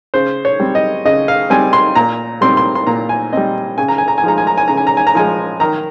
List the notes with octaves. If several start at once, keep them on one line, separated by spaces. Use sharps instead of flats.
C#3 C5
C#5
G3 C4
D#5
C#3 D#5
F5
G3 C4 G#5
C6
A#2 A#5
G3 C4 C6
C6
C6
A#2 A#5
G#5
G3 C4 D#5
C#3 G#5
A#5
G#5
A#5
G#5
F3 G#3 A#5
G#5
A#5
G#5
C#3 A#5
G#5
A#5
G#5
A#5
F3 G#3 G#5
D#3 A#5